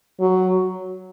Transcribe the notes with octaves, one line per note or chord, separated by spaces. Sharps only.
F#3